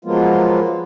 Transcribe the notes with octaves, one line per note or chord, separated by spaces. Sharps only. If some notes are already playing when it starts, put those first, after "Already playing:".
F3 F#3 G#3 A#3 B3 F4